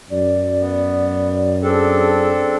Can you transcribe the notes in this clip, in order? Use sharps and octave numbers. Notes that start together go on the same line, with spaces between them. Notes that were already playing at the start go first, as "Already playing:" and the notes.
F#2 D5
B3
C4 D4 G#4 A4